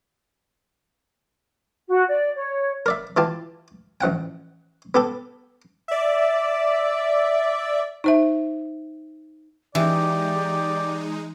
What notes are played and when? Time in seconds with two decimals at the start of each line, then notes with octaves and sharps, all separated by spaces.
1.88 F#4
2.08 D5
2.35 C#5
2.86 A#4 D5 E5
3.17 E3 F4 G4 A5
4.01 A1 F3 F#5 G5
4.94 B3 G4 A4
5.88 D5 E5
8.04 D#4 C5 E5
9.75 E3 G#3 D#4 G4 D5